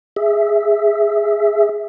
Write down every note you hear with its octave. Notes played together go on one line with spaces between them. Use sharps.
G#4 E5